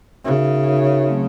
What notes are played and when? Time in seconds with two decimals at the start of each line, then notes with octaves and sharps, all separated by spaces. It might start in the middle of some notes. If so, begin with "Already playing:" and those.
0.25 C#3 D#4 F#4 A#4 C#5 E5
0.65 D#4 F#4 A#4 C#5 E5
1.07 F#3 A3 C4